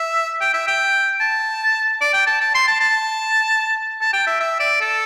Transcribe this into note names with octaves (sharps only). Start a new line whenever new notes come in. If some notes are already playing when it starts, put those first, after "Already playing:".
Already playing: E5
G5
E5
G5
A5
D5
G5
A5
A5
C6
A5
A5
A5
G5
E5
E5
D5
A4